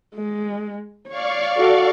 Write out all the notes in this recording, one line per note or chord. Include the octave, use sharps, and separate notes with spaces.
G#3
C#5 D5 F5 C#6
F#4 A4